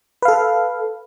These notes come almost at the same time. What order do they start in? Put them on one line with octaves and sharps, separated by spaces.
B4 F5 A4